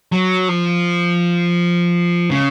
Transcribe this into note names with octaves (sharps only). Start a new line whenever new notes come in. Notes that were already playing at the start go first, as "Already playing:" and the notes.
F#3
F3
C#3